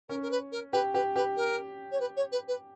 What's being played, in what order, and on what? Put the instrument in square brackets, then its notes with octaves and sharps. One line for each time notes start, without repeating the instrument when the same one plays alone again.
[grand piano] C#4 [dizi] A#4
[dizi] A#4
B4
A#4
[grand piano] G4 [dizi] B4
[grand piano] G4 [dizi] B4
[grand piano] G4 [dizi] B4
[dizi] A#4
C#5
B4
C#5
B4
B4